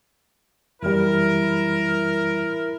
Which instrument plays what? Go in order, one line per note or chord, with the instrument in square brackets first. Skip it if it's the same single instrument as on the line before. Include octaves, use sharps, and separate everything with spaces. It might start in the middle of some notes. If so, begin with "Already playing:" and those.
[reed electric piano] F#2 E3 G3 [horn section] E4 A#4